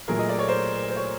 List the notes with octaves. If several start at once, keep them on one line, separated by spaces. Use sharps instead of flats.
A#2 F#3 A3 G#4 A#4
D#5
D5
C#5
A#4 C5
C5
C#5